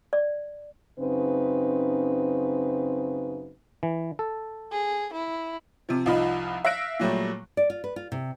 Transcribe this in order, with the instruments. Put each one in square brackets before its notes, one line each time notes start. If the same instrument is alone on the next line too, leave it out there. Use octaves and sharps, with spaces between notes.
[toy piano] D5
[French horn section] F#2 C#3 C4 D#4 B4
[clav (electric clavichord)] E3
A4
[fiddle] G#4
E4
[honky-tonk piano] C3 F3
C2 F3 D#4 F4 B5
E5 F5 F#6 A#6 D7
A#2 F#3 G3 A3
[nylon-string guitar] D5
F4
B4
F4
C3